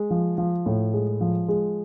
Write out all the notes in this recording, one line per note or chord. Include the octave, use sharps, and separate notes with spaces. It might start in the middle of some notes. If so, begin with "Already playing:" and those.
Already playing: G#3
F3
F3
A2
G#3
F3
G#3